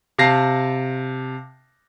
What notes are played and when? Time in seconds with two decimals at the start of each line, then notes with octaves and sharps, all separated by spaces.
0.18 C3 F5 A5 A#6 C7